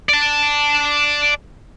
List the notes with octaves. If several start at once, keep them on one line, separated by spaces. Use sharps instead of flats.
D5 A5